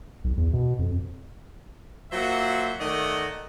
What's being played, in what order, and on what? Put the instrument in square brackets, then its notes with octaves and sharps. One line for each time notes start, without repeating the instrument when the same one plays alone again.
[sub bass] B1
E2
B2
F2
[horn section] F#3 A#3 F4 C5 E5 F#5
D#3 A3 A#4 D5 D#5 F#5